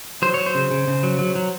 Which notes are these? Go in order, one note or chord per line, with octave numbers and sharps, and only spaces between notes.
F#3 C5
F#3 C#5
C5
C#3
C#3
C#3
F#3
F#3
F#3